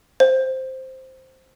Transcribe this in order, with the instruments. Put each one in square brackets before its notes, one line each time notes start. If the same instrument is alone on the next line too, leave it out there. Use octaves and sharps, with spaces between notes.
[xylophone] C5